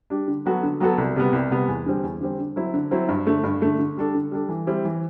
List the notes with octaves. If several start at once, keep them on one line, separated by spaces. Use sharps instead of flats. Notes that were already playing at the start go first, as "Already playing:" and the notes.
G3 D4 G4
D3
F#3 B3 F#4 A4
D3
F#3 B3 F#4 A4
C2
C3 G3 B3
C2
C3 G3 B3
E2
D3 G3 C4
E2
D3 G3 C4
D3
F#3 C4 E4
D3
F#3 C4 E4
G2
D3 A3
G2
D3 A3
D3
G3 D4 A4
D3
G3 D4 A4
E3
G3 C4 E4
E3